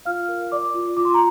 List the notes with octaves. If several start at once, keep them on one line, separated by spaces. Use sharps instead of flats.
F4 F5 F6
A#4
D5 D6
F4
F4 D6
C6
A#5